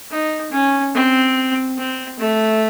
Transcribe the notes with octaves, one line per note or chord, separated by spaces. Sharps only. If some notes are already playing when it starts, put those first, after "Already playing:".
D#4
C#4
C4
C4
A3